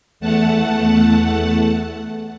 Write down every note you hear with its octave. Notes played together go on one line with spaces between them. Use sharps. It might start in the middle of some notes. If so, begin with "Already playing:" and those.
E2 A3 F#5 A5